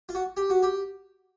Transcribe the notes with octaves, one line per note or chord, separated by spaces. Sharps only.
F4
F#4
G4
F#4
G4